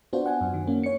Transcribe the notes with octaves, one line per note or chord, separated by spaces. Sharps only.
B3 D4 F4 F#4 C5
F#5 G#5
F#2
D#3
A#3 C#4
C#5 C#7